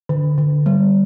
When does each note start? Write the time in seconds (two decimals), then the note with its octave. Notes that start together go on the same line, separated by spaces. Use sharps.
0.09 D3
0.38 D3
0.66 G3